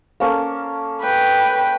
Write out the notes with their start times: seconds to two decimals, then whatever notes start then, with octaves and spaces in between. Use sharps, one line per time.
0.20 A#3 C#4 A4
1.02 B4 G5